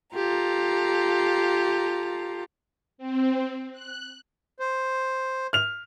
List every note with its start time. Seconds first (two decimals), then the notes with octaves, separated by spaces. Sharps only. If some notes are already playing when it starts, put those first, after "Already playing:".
0.15 F4 G4 A4 A#5
2.98 C4
3.72 F#6
4.60 C5
5.53 F6 F7